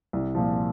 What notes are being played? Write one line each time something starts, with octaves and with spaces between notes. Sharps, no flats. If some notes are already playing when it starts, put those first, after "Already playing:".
C2
A#2 F3